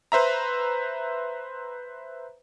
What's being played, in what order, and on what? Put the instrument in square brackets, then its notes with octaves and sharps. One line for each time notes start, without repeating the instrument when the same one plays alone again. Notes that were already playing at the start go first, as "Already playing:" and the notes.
[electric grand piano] B4 C5 E5 A#5